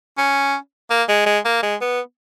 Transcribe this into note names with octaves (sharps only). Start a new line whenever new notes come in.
C#4
A#3
G#3
G#3
A#3
G#3
B3